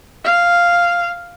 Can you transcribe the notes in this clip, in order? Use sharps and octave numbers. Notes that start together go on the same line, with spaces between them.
F5